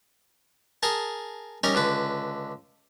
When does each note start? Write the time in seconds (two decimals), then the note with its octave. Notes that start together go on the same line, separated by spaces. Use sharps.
0.83 G#4 A#4 A5
1.64 G3 C#4 D#4 A#4
1.75 C#2 D3 B4